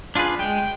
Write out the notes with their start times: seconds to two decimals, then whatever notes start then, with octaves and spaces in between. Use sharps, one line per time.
0.15 D4 F4 G#4 B4
0.39 G#3 G5